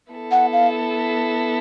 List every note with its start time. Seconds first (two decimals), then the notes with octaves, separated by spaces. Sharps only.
0.11 B3 E4 A4
0.31 F#5
0.53 F5